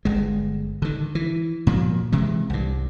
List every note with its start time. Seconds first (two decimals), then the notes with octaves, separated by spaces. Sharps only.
0.05 G1 G#3
0.82 D3 D#3
1.15 E3
1.67 A#2 F3 F#3
2.12 C3 E3 G#3
2.50 C2 G2